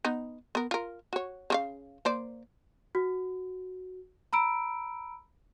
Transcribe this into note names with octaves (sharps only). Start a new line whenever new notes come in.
B3 D#4
B3 A#4
F4 A#4
F#4 C#5
C#3 F4 F5
A#3 C5 D5
F#4
A#5 B5 E6 D7